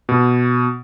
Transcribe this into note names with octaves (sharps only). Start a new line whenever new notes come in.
B2